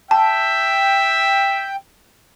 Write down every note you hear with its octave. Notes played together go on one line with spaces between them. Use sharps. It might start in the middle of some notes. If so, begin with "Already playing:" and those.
E5 G5 A5